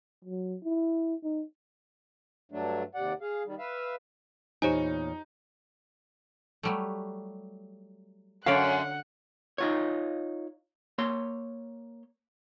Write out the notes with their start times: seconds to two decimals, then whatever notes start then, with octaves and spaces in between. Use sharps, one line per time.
0.25 F#3
0.64 E4
1.24 D#4
2.52 G2 F#3 A3 D4
2.95 D#2 C3 D5 F#5
3.21 G#4 F5
3.46 D#3 G3
3.59 B4 E5 F5
4.62 E2 A#2 D#4 G4 C5 C#5 G#5
6.63 F#3 G3 A3
8.46 F#2 D3 C#5 D5 F5 F#5
9.58 D#4 F4 C#5
10.98 A#3 C#5 C6